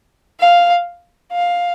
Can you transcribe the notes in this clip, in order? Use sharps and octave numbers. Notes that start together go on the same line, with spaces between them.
F5
F5